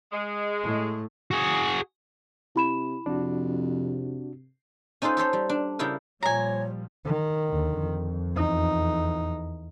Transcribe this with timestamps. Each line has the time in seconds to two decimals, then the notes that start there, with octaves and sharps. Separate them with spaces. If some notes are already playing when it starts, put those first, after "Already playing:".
0.12 G#3
0.62 A2
1.31 F#4 G#4
2.56 C3 E4 B5 E7
3.06 F2 C3 D4 F#4
5.02 C#4 D#4 F4 A4 C5 F#5
5.17 G4 A4 C5 C#5
5.33 G3
5.49 D4
5.79 C#3 G3 E4 G4 A#4
6.23 A#2 F3 G3 C#5 G#5 A#5
7.06 D#3
7.49 D#2 D3
7.78 F2
8.36 E2 D#4